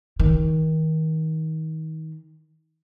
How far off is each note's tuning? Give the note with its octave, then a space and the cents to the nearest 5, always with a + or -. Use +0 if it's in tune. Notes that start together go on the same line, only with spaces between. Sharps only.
D#3 +30